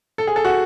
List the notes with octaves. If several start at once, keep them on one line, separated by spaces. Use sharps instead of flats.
A4
G#4
A4
F#4